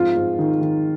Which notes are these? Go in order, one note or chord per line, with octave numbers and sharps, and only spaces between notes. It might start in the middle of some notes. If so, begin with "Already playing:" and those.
Already playing: F2 G#2 F4
G#2
D#3
D#3